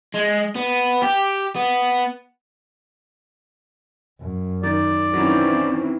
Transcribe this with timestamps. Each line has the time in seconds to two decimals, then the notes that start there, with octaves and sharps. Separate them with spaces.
0.14 G#3
0.56 B3
1.02 G4
1.56 B3
4.20 F#2
4.63 D#3 D5
5.13 D#3 E3 F#3 C4 C#4